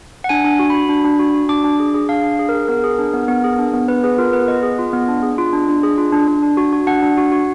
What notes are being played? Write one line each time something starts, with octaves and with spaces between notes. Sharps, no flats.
F#5
D4 G#5
D4
F#4
F#4 B5
D4
D4
F#4
F#4
D4 D6
D4
G#4
G#4
D4 F5
D4
G#4
A#4
G#4
B3 A#4
G#4
D4
B3
B3
G#4
D4
B3
B3 B4
G#4 B4
F4 A#4
B3 B4
B3 D#5
G#4
F4
B3
D4
G#4
F4
D4
D4
G#4
F4
D4
D4
D4
F#4
F#4
D4 F#5
D4
F#4
F#4